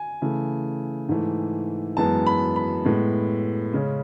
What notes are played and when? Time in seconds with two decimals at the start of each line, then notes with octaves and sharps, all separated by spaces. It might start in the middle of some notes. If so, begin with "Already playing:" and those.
Already playing: G#5
0.22 C#3 E3 A3
1.09 G#2 E3 A3
1.97 F#2 E3 G#3 B3 A5
2.27 B5
2.56 B5
2.85 A2 G#3 B3
3.73 C#3 G#3 C#4